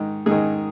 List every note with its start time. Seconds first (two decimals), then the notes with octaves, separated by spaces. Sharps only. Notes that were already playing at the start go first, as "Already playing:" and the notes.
Already playing: G#2 D#3
0.26 G#2 D#3 G#4